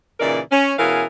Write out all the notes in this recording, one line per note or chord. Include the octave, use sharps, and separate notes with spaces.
A#2 C#3 E3 D#4 A#4 D5
C#4
B2 E3 C#4 G#4 A#4 F5